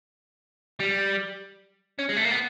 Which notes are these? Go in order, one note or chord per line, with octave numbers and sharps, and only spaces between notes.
G3
C#4
G#3
A3
A#3
B3